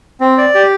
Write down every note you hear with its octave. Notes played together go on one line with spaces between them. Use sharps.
C4
D5
G4